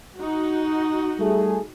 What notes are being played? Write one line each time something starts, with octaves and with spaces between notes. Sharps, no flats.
D#4 F#4
G3 A3 G#4